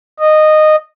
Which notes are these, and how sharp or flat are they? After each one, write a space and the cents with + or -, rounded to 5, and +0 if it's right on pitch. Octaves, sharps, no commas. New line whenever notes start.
D#5 -15